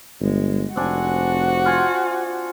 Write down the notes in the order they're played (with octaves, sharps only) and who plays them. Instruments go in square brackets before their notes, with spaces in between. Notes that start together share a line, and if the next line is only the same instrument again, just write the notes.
[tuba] G1 [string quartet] G#3
[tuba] F1 [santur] C4 D4 G#5 [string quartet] F#4
[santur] F4 C5 G#5